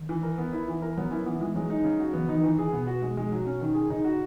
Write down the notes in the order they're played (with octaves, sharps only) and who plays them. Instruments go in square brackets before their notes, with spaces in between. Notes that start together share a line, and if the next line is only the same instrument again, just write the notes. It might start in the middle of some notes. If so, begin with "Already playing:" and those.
Already playing: [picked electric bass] D#3
[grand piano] E3
A#4
B3
E4
E3
A#4
[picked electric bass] F#3 [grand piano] B3
[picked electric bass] C#4 [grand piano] E4
[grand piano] E3 [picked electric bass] B3
[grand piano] E3 [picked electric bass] G#3
[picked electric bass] F#3 [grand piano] G#3
[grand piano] D#4
C#3
F#4
[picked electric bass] E3 [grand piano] B3
[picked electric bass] E3 [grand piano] D#4
[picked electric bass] D#3 [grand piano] E3
[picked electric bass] C#3 [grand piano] G#4
[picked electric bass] B2 [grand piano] B3
[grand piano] F#4
G#3
G#3
F#3
C#4
D#3
G#4
[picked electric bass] C#3 [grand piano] D#4
[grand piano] F#4